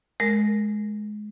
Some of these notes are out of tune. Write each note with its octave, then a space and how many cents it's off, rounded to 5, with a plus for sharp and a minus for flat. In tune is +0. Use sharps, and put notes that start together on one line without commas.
G#3 +20 A#4 +0